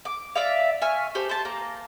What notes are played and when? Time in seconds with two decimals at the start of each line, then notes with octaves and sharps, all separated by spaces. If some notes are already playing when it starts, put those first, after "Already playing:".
0.05 D6
0.36 D5 E5 F5
0.82 E5 G#5 C#6 F6
1.15 G4 A4 C5
1.29 C5 A5
1.45 A#3 A#5